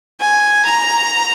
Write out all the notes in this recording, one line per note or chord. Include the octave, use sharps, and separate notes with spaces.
G#5
A#5